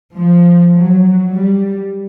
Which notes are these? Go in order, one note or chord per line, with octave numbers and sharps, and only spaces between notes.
F3
F#3
G3